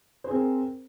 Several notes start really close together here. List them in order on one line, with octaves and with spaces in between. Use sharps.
C5 G#4 C4 A#4